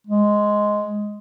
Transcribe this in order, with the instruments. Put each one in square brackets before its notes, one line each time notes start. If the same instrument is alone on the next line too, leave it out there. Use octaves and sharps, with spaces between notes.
[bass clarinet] G#3